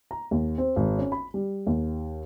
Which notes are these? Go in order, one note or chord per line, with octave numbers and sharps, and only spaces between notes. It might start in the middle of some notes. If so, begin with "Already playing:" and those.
A#5
D#2
C4
G#1
C#4
B5
G3
D#2